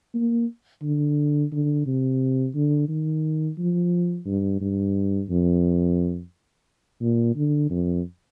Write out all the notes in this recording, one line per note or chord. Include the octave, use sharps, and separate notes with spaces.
A#3
D3
D3
C3
D3
D#3
F3
G2
G2
F2
A#2
D3
F2